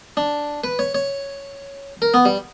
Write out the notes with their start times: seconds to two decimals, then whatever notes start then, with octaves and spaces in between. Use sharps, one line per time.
0.17 D4
0.64 B4
0.79 C#5
0.95 C#5
2.02 A#4
2.14 B3
2.25 G3